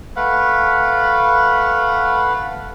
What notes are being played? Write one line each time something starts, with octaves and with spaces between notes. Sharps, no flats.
A3 B4 F5 F#5